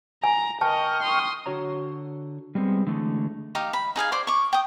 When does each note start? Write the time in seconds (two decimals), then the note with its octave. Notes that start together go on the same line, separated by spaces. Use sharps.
0.24 G#5 A#5
0.61 A#4 D#5 G5 A5 C#6 F6
1.03 C6 D#6
1.46 D3 F#4 C#5 A#5
2.55 G3 G#3 B3 C4
2.87 D3 E3 G#3 A3
3.55 D#4 G4 F5
3.73 B5
3.96 D#4 G#4 F5 G#5
4.12 C5 D5 C6 D6
4.27 C#6 D6
4.53 G5 D#6